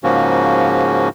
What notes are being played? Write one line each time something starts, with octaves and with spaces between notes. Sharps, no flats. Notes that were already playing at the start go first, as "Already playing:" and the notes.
G#2 C#3 F3 A#3 C#4 F#4